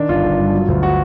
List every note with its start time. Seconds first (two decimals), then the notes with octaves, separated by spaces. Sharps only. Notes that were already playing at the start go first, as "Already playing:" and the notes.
Already playing: D#3 D4
0.09 G1 F4
0.24 G1
0.39 G2
0.54 F#3
0.68 D2
0.83 F#4